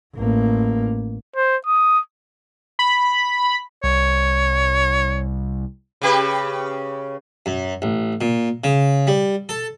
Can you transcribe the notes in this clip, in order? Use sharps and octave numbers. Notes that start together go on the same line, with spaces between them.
A1 A#3
C5
D#6
B5
C2 C#5
C#3 G4 B4
F#2
A1
A#2
C#3
G3
A4